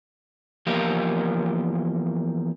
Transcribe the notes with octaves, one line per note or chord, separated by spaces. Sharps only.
E2 F3 A#3 G4 A#4 F5